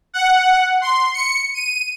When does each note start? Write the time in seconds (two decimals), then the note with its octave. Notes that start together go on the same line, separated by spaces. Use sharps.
0.14 F#5
0.81 C6
1.14 C#7
1.54 D#7